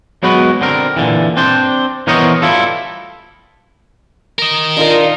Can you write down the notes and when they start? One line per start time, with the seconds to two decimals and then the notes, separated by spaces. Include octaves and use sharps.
0.23 F#3 G#3 B3 F#4 B4
0.61 D3 C4 A#4
0.96 A#2 D3 E3
1.37 C4 D4 C5
2.07 E3 B3 A#4 C5 C#5 D#5
2.42 G3 E4 F4 A4
4.39 A#4 D#5
4.77 D#3 D4 D#4 F4